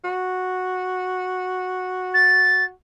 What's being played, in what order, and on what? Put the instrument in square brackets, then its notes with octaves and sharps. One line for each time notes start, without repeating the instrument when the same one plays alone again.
[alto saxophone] F#4
[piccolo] A6